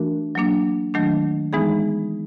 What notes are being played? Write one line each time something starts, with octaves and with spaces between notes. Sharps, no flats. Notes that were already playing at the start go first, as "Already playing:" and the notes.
Already playing: E3 A3 D4 F#4 A#4
F#3 A#3 D4
D#3 F#3 A3 D4
E3 G#3 B3 D#4 G#4